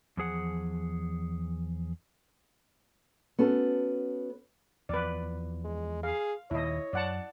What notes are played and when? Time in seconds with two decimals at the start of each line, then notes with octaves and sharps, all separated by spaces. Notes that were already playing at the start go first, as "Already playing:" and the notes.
0.17 E2 F3 G#4 F#5
3.39 B3 C#4 F#4 A4
4.89 E2 F3 B4 D5
5.65 G#3
6.03 G#4 F5
6.51 D#2 A#2 E4 C#5 D#5
6.93 F#2 D5 F#5 A5